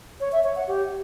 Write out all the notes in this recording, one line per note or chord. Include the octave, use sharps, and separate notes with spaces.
C#5
E5
C#5
F#5
G4